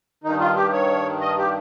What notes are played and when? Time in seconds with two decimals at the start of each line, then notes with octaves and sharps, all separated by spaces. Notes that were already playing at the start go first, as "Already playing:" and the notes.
0.24 G2 D#3 D#4
0.40 F4
0.56 G4
0.73 C#5
1.21 D#5
1.38 G4